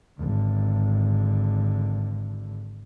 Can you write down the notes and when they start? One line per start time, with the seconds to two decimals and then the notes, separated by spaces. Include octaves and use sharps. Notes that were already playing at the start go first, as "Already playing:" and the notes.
0.19 G#1 D3